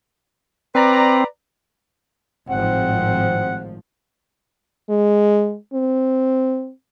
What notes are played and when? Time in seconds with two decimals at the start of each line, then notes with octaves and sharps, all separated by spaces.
0.75 C4 B4 D5 A#5
2.50 G#1 A2 F3 C4 F#5
4.90 G#3
5.74 C4